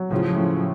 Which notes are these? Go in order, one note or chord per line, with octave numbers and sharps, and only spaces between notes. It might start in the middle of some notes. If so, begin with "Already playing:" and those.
Already playing: F#3
A2 C#3 F3
A2